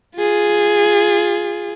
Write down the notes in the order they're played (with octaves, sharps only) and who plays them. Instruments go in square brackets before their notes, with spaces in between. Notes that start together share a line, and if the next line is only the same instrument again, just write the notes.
[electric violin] F4 G#4